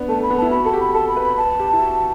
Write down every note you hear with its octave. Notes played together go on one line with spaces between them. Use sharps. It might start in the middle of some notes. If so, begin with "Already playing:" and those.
Already playing: B3 D4
A3 A5
B5
B3
E4 A5
F#4 B5
A4 A5
G4
B5
A4 A5
B5
B4
B5
B4 A5
G4
E4
F#4